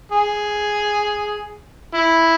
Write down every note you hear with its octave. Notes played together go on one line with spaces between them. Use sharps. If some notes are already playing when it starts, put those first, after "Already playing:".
G#4
E4